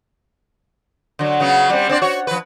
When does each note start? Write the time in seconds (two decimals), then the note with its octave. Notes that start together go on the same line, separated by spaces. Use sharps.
1.19 D3 F#3
1.40 C#3 F#3 B3
1.70 G3 C4
1.89 C4 D4 D5
2.02 F#4 C#5
2.27 F3 B4